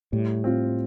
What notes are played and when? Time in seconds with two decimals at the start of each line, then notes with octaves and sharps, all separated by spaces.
0.12 A2 G3
0.44 C4 F4